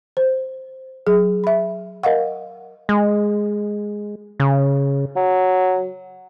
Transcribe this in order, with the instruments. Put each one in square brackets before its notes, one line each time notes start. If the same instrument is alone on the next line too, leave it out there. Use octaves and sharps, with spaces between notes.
[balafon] C5
F#3 G#4
E5 B5
A#4 D#5 F5 F#5
[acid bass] G#3
C#3
[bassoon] F#3